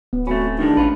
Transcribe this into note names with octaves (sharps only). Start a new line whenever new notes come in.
D1 B3
A3 C4 C#4 F#4 B5
A2 D#3 G#3 D4 D#4
A1 C#4 F4 B4